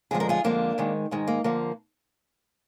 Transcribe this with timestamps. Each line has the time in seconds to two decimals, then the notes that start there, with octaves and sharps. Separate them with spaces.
0.11 F2 D3 F3 G#3 G#4
0.20 A#4
0.29 F4 G#4
0.44 F2 D3 F3 G#3 A#3 D4
0.78 G#2 D#3 G#3
1.11 G#2 D#3 G#3
1.27 A#3
1.44 D3 F3 A#3